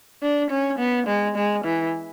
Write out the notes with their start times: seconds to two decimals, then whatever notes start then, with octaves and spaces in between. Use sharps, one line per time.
0.22 D4
0.51 C#4
0.79 B3
1.07 G#3
1.36 G#3
1.65 E3